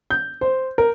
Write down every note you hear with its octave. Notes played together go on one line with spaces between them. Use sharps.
G6
C5
A#4